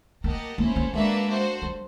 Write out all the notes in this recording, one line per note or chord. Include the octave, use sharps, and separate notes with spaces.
A#3 G4 A#4 D#5 F#5 A5
A#3 C#4 E4 A4 C5
A#3
G#3 A#3 D4 F#4 B4 E5
F#4 A4 C5
G3